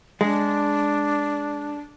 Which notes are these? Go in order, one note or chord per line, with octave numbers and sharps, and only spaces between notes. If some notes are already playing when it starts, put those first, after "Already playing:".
G#3 D4